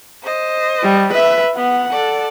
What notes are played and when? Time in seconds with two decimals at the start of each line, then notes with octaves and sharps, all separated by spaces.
0.23 C5 D#5
0.83 G3
1.13 B4 E5
1.56 B3 F#5
1.92 A4 D5